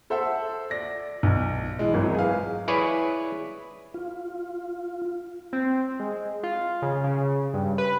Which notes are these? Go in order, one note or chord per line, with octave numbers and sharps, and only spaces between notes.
A4 C5 E5 F#5
D5 A#6
B1
E3 G#3
G#1 E3 F#3
G#4 B4 F5
E4 G#4 B4 C#5 D5
F4
C4
G#3
F4
C#3
C#3
G2
B4